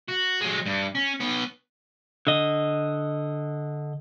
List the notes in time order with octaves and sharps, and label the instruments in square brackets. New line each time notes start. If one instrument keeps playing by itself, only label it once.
[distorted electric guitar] F#4
F#3 G#3
G2
C#4
B3 C#5
[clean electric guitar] D3 D#5